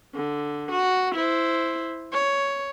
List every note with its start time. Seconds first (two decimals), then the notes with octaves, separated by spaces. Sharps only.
0.15 D3
0.72 F#4
1.15 E4 C5
2.13 C#5